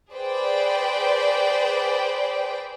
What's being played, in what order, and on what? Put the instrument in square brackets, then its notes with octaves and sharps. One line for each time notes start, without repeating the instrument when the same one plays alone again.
[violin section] G#4 B4 C5 D5 G5